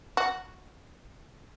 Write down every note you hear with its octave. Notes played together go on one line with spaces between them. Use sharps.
F#4